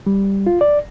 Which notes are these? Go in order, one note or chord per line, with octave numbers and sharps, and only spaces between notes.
G3
F4
D5